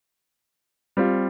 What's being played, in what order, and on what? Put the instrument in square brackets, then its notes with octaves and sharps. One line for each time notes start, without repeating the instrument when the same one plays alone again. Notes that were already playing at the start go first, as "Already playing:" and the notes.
[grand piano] G3 C4 F4